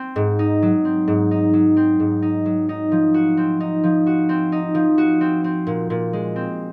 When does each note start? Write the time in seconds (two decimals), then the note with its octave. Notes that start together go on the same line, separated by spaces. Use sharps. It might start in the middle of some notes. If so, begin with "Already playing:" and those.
Already playing: C4
0.16 G#2
0.39 D#4
0.62 F#3
0.85 C4
1.08 G#2
1.31 D#4
1.53 F#3
1.77 C4
2.00 G#2
2.22 D#4
2.45 F#3
2.69 D#4
2.92 F3
3.14 F#4
3.37 C4
3.60 D#4
3.84 F3
4.07 F#4
4.29 C4
4.52 D#4
4.75 F3
4.98 F#4
5.21 C4
5.44 C4
5.67 A#2
5.90 A#2
6.13 G#3
6.36 C4